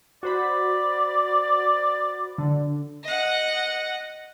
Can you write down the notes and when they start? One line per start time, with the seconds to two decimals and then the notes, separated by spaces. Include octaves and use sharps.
0.23 F#4 C5 D5 B5
2.38 D3
3.04 D#5 F#5